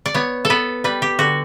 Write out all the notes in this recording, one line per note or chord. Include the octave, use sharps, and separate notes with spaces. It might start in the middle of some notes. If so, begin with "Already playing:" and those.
D5
B3 C#5
A4
B3 B4
G3 B4
G4
D3 F#4